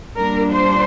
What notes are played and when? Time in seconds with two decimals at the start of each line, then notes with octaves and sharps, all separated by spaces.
0.16 A#2 G3 D4 A#4
0.52 C5